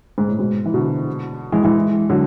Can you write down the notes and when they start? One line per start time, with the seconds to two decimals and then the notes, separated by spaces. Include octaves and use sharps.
0.18 G#2
0.28 A2
0.39 G#2 B2
0.65 E3
0.74 B2 D3
1.52 E3 G#3
1.63 E3 G#3
2.10 D3 F#3